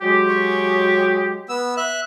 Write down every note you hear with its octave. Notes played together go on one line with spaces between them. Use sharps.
F#3 G#3 G4
C#5
B3 E6
E5 F#6